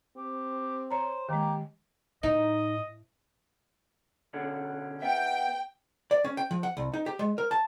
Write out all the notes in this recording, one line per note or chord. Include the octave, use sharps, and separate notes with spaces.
C4 G4
C5 C#5 A#5
D#3 G#3 A#3 G4
A2 D#4 D#5
B2 D3 C#4
B3 E5 G5
D5
C#4
G5
F3
F#5
C2
D#4
G4
G#3
A#4
A5